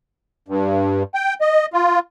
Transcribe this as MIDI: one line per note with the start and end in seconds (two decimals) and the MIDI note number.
0.48 1.03 43
1.14 1.34 79
1.41 1.66 75
1.73 1.99 65